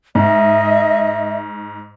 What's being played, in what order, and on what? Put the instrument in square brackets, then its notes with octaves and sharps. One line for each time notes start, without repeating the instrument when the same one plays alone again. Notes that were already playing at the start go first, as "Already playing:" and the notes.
[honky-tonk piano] G#2 [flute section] D#5 E5